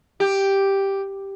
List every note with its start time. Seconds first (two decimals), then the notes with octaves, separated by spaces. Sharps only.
0.20 G4